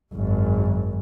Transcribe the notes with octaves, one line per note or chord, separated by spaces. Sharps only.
G#1 F#2